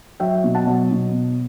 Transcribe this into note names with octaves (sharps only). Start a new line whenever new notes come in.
F#3 E5 G5
B2
F#5 A5
F#3
B2